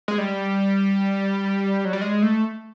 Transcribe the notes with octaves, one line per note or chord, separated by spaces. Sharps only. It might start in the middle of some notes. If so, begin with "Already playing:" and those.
G#3
G3
F#3
G3
G#3
A3